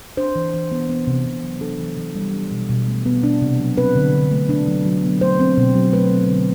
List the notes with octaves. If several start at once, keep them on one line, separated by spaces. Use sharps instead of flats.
D4 C5
E3
E3
B3
B3
C3
C3
F#3
D4 A4
E3
E3
G3
D4
B2
B2
A3
B3
D4
C3
F#3
C4 B4
D3
D3
A3
D4
F#3
F#3
B3
A3 C5
C4
B2
F#3
A3 B4
C4
D3